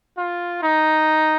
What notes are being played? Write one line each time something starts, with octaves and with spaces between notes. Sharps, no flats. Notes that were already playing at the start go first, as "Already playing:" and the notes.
F4
D#4